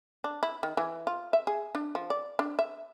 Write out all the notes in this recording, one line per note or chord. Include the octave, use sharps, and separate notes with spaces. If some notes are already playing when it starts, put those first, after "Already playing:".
D4
E4
D#3
E3
F4
E5
G#4
D4
F3
D5
D4
E5